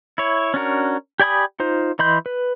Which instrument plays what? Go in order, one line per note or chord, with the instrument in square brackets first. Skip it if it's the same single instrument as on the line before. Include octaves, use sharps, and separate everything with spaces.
[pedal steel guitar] E4 C#5
C#4 D4 F#4 A#4
G4 D5 G#5 B5 D#6
D#4 F4 C5
E3 D#5 B5 C6 G6
B4